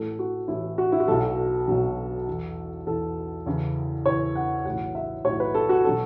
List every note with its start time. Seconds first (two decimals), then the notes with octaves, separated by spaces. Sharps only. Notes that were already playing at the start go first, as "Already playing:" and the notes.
Already playing: A1 A2 E3 A4
0.19 F#4
0.48 A1 A2 E3 E4
0.78 F#4
0.92 E4
1.00 F#4
1.08 B1 B2 F#3 A4
1.68 B1 B2 F#3
2.27 E2 E3
2.87 E2 E3 A4
3.46 E2 C#3 E3
4.06 E2 C#3 E3 C#5
4.35 F#5
4.65 B1 A2 E3 F#5
4.95 E5
5.25 B1 A2 E3 C#5
5.40 B4
5.54 A4
5.69 F#4
5.84 B2 F#3 A4